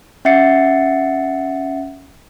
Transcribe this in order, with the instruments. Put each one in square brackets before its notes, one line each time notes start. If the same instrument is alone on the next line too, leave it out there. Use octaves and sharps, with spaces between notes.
[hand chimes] C#4 E5 F#5 A6 C7 C#7